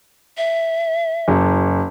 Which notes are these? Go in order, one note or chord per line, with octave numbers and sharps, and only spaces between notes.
E5
F#1